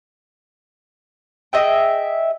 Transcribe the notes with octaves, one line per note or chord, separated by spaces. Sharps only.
G#4 D#5 E5 G5